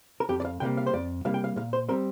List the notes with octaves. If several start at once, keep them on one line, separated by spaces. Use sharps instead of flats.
A#4
F2 G4
D5
F5
C3 G3 A#3 G5
F5
C5
F2 D5
C3 G3 A#3 F5
G5
F5
A#2 F5
C5
G3 C4 A#4